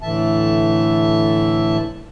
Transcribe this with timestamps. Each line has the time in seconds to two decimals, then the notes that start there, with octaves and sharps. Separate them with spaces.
0.01 A2 D3 E3 E5 A5